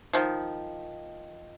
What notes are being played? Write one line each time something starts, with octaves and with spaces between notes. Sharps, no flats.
D#3 F3